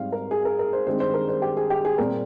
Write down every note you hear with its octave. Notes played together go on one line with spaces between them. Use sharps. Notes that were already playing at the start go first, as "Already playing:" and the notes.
Already playing: G#2 G3 C4 F5
A#4
G#4
A#4
A#4
C5
G2 D#3 G#3 C4 C5
C5
A#4
C5
G4
G#4
G4
G#4
A#2 G3 C4 A#4